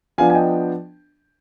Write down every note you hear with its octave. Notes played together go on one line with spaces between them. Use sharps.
F3 B3 D4 F4 F5 G#5
G#5
D#5 G5